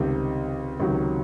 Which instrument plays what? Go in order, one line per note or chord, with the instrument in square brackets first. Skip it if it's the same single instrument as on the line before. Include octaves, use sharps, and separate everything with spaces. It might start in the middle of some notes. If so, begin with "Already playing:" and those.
Already playing: [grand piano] C#2 C3 D#3 G3 C4
C#2 C3 D#3 F#3